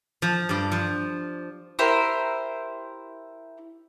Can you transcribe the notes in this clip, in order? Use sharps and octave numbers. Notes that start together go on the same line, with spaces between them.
F3
G2 D5
F3
E4 G4 A#4 C5